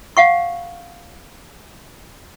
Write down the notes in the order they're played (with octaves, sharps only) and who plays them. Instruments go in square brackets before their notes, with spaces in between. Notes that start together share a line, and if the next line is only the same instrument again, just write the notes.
[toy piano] F5 F#5 C#6